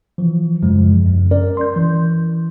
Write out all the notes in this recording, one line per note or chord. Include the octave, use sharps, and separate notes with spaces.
E3 F3
F#2 C#3 F3 G#3
F#2
C#4 A#4 D5
C6 G6
E3